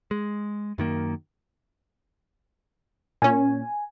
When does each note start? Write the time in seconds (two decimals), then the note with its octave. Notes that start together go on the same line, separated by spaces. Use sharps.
0.11 G#3
0.78 F#2 D#3 A#3
3.22 A#2 C#4 G#5